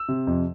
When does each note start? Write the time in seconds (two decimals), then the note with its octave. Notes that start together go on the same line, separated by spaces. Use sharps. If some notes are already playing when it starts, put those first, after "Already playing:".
Already playing: E6
0.09 C3
0.27 F2